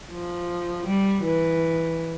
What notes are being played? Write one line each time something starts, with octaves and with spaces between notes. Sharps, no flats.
F3
G3
E3